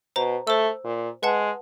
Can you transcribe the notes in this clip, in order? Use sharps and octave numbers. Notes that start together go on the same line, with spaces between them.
B2 C5 A#5
A3 C5 E6
A#2
G#3 B4 F#5 A5